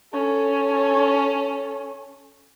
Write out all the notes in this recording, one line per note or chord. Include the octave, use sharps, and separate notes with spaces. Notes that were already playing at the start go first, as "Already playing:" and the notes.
C#4 A4